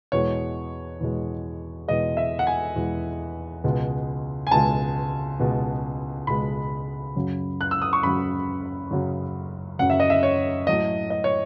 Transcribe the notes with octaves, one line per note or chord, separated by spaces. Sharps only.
E2 B2 G#3 C#5
E2 B2 G#3
E2 B2 G#3 D#5
E5
F#5
G#5
E2 B2 G#3
C#2 B2 G#3
G#5
C#2 B2 G#3 A5
C#2 B2 G#3
C#2 B2 G#3 B5
F#2 C#3 F#3
F#6
E6
D#6
C#6
F#2 C#3 F#3 B5
F#2 C#3 F#3
F#2 C#3 F#3 F#5
E5
D#5
E5
C#5
A2 F#3 A3 D#5
D#5
C#5